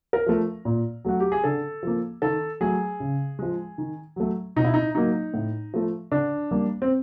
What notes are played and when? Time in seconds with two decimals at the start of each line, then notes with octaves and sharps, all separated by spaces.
0.13 A#4
0.26 F3 A3
0.65 A#2
1.05 F#3 A3 F#4
1.20 G4
1.32 G#4
1.44 D3 A4
1.83 F3 A#3
2.22 D#3 A4
2.61 F#3 A3 G#4
3.00 C#3
3.39 F3 G#3
3.78 D#3
4.16 F#3 A3
4.56 B2 D#4
4.65 E4
4.74 D#4
4.95 F#3 A#3 D#4
5.34 A2
5.74 F3 A3
6.12 D3 D4
6.51 G3 A#3
6.82 C4